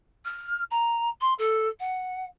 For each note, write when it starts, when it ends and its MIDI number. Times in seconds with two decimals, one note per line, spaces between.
0.25 0.62 89
0.71 1.09 82
1.21 1.33 84
1.39 1.68 69
1.80 2.24 78